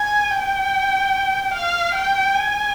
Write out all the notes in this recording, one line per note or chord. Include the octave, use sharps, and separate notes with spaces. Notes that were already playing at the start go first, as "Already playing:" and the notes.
Already playing: G#5
G5
F5
G5
G#5